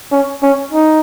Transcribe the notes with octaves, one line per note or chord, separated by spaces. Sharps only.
C#4
C#4
D#4